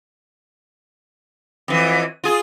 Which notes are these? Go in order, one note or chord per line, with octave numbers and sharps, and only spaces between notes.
F2 E3
F4 G#4